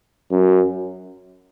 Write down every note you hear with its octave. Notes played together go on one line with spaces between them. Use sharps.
F#2